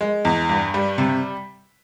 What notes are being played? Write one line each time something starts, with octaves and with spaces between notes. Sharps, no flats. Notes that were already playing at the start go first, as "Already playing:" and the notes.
G#3
E2
G2
G3
C3